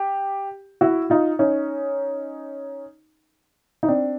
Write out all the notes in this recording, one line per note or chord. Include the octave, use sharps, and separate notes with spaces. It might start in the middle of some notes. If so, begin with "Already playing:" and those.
Already playing: G4
E4 F#4
D#4 F4
C#4 D#4
D#4
C4 D4